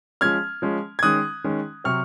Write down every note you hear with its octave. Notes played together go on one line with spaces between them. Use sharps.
F3 G#3 C#4 F6 G#6
F3 G#3 C#4
G#6
D#3 G#3 C#4 D#6 F#6
D#3 G#3 C#4
C3 F#3 C4 C#6 F6